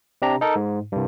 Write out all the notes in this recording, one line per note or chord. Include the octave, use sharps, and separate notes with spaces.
C3 D4 G4 A#5
D#4 A4 A#4
G#2
C2 G2